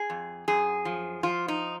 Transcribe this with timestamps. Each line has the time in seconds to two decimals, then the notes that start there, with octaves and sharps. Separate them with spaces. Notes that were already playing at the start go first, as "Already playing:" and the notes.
Already playing: G#4
0.10 F2
0.48 F#2 G#4
0.85 F3
1.23 F3 F4
1.48 D#4